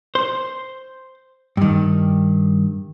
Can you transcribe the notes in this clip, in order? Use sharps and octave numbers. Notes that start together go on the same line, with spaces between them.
C5
G2 D#3